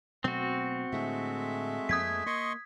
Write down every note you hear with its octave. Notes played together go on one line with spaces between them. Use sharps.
B2 F#3 A3 C4 F#4
A2 D3 G#3 A3 E5
F2 F3 A#3 D#6 G#6 B6
A#3 D#5 C6 C#6